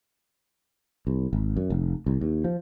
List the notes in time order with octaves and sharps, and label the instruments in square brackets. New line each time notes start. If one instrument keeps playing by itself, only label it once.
[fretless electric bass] C2
G#1
F#2
F1
C2
D#2
F3